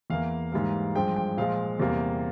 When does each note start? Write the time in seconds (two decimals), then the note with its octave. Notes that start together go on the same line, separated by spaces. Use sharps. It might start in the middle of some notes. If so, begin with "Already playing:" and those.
0.10 E2 E3 A#3 F5
0.52 G#2 E3 G3 A#3
0.96 G2 F3 G#3 G5
1.16 G5
1.37 A#2 F3 G#3 F5
1.80 E2 C3 G3 A#3